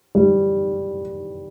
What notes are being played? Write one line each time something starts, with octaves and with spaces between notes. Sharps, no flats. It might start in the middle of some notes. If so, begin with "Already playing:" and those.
G3